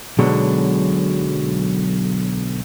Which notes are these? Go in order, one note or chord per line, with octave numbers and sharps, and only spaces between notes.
B1 B2 D3 F#3 G#3